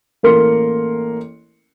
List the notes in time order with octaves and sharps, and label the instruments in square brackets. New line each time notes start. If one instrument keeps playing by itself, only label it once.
[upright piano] A1 A#3 A4 A#4 C6 C#7